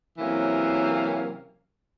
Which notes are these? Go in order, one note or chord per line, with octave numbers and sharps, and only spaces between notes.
C3 E3 F#3 A#3 C#4 A#4